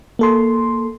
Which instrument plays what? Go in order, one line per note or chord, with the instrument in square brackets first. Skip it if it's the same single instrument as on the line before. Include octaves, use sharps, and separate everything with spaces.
[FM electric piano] A#3 A4 C6